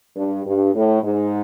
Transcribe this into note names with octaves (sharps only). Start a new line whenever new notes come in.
G2
G2
A2
G#2